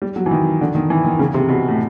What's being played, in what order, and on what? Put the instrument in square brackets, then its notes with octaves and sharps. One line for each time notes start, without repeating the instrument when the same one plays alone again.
[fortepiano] G3
F#3
E3
D#3
D3
D#3
E3
D#3
C#3
C3
B2
A2